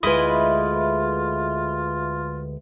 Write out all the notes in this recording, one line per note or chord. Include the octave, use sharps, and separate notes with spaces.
D2 G#3 E4 F4 B4 D#5